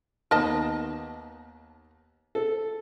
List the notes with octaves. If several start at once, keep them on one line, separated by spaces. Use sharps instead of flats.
D#2 B3 A#4 D#5 A5
A4